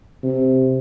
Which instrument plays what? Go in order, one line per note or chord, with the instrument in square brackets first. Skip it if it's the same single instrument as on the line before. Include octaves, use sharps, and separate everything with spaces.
[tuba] C3